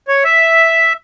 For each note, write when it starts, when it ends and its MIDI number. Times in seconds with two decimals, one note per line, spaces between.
0.08 0.24 73
0.24 0.93 76